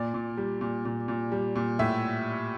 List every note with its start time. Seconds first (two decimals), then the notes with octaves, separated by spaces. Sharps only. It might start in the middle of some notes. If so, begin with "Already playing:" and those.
Already playing: A#2 D5
0.14 A#2
0.37 G3
0.61 A#2
0.85 A#2
1.08 A#2
1.32 G3
1.56 A#2
1.79 A2 E5